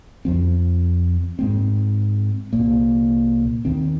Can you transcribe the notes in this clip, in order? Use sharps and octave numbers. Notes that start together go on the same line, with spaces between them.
F2 F3 C4
G#2 G#3 C4
C2 A#2 A#3
D#2 D#3 C4